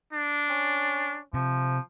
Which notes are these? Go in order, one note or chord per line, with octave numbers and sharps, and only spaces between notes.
D4
C#4
C3 F3